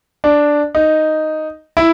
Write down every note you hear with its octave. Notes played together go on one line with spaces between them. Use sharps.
D4
D#4
E4